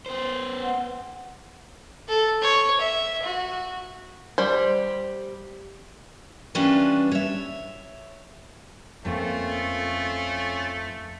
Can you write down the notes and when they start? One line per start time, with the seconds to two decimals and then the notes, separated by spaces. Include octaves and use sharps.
0.06 B3 C5 C6
0.61 F#5
2.09 A4
2.42 C#5
2.81 E5
3.23 F#4
4.38 G3 C5
6.55 E3 G3 C#4 D4 F4 B4
7.12 C#5 E5
9.05 F2 A3 A#3 C#4 F4